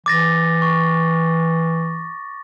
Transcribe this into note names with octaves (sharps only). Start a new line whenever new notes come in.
E3 D6 A6 A#6
C#6